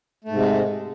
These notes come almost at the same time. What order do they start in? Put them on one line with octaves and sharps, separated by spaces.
A3 G#2 C3 G#3